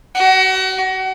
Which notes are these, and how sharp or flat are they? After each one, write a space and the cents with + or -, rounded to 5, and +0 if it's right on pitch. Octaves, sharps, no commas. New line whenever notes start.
F#4 +35